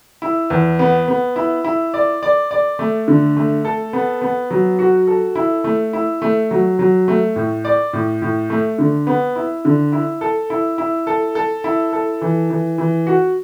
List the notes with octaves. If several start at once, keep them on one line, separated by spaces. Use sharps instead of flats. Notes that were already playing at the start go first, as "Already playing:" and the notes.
E4
E2
B3
B3
E4
E4
D5
D5
D5
A3
D3
A3
A4
B3
B3
F#3
F#4
A4
E4
A3
E4
A3
F#3
F#3
A3
A2
D5
A2
A2
A3
D3
B3
E4
D3
E4
A4
E4
E4
A4
A4
E4
A4
E3
E3
E3
F#4